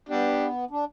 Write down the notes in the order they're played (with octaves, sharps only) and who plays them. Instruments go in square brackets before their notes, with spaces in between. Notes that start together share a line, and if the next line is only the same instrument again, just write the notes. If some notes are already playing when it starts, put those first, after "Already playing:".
[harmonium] B3 [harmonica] D4 G4
[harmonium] D4